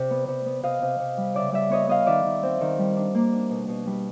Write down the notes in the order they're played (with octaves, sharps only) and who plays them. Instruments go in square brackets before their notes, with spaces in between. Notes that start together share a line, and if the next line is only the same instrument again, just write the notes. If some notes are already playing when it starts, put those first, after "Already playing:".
Already playing: [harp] C3 D5
B3
C3
B3
C3 D#5 F5
C3
C3
G3
C#3 D5 E5
G3 D5 E5
B3 C#5 D#5
B3 D#5 F5
D#3 D5 E5
D#3
C4
D#3
G3
D4
A#3
D4
B2
B2
G3